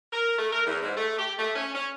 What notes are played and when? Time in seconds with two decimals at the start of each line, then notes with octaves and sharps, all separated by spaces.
0.13 A#4
0.38 A3
0.51 A#4
0.66 E2
0.82 G#2
0.96 A3
1.17 G4
1.39 A3
1.55 C#4
1.74 C#4